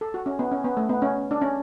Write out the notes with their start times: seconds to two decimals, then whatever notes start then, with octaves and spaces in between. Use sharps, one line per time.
0.01 A4
0.14 F#4
0.26 C#4
0.39 B3
0.51 C#4
0.64 B3
0.77 A3
0.89 B3
1.02 C#4
1.31 D4
1.42 C#4